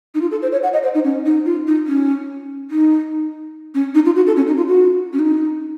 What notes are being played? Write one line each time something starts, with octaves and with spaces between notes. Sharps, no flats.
D#4
F4
A4
C5
C#5
F#5
D#5
C5
D#4
C#4
D#4
F4
D#4
C#4
D#4
C#4
D#4
F4
F#4
A4
C#4
D#4
F4
F#4
C#4
D#4